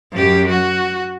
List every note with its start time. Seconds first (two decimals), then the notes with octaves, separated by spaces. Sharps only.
0.12 F#2 G4
0.49 F#4